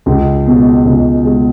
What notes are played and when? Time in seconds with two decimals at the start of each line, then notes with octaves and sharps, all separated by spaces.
0.06 C#2
0.47 B2 G#3
0.85 C#2
1.25 B2 G#3